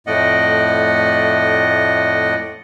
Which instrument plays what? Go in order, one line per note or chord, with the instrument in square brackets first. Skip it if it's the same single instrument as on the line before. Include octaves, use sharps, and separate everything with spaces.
[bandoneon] F2 A2 A3 D5 D#5 F#5